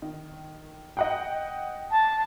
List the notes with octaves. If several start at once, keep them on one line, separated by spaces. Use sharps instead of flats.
D#3
D#5 F#5 G5
A5